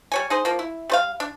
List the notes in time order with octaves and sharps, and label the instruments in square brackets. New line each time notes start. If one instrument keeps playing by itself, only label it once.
[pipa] G3 C#5 G#5
D#4 G#4 C5
F3 A#3
E4
G3 C5 F5
D4